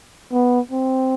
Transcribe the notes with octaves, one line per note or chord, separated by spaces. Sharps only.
B3
C4